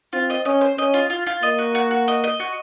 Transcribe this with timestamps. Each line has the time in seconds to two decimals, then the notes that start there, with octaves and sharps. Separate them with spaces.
0.13 C4 F4
0.30 D#5
0.45 C#4 D#5
0.61 C5
0.78 C#4 D#5
0.94 F4
1.10 F4
1.27 F4
1.42 A#3 D#5
1.59 F#4
1.75 F#4
1.91 F#4
2.08 D#5
2.24 D#5
2.40 F#4